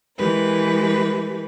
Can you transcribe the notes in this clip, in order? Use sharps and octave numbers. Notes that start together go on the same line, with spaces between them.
E3 G#3 G4 A#4 B4